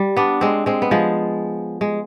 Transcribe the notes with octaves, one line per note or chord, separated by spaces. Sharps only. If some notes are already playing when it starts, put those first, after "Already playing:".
Already playing: G3
B3 D4
G#3 C4
G#3 C4
B3
F3 G#3
G#3